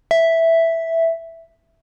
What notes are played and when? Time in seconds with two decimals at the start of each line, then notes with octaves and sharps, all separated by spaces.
0.11 E5